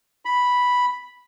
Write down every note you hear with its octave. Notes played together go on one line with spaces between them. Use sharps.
B5